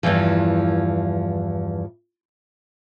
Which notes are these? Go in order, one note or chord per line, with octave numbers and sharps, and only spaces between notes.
E2 G2 A#2 E3 F3